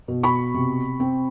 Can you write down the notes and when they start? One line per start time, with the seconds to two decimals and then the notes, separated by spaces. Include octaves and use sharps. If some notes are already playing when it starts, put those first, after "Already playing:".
0.08 B2
0.23 B5 C#6
0.54 C3
1.00 C4